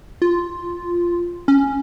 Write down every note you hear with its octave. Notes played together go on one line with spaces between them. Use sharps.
F4
C#4